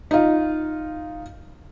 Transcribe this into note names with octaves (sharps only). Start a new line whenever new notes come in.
D#4 F4